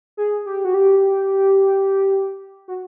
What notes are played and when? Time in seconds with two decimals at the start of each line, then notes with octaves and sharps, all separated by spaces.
0.17 G#4
0.46 G4
0.65 F#4
0.74 G4
2.68 F#4